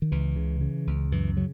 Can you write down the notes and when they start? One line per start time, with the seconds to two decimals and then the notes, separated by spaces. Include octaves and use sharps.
0.02 D#3
0.12 C#2 E3
0.36 C#3
0.61 C#3
0.87 C#2
1.12 F#2 E3
1.36 C#3 F#3